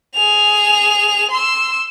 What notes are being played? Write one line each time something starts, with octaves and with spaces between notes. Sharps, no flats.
G#4 F7
C6 E6